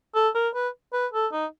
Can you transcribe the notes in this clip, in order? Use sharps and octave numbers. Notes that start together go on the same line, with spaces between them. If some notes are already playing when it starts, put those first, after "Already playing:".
A4
A#4
B4
B4
A4
D#4